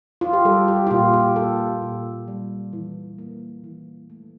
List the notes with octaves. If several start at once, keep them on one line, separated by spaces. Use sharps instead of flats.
F4
G4
G3 A4
G4
F4
A#2 G4
G4
A#3 A4
A#2
G3
E3
A#3
E3
A3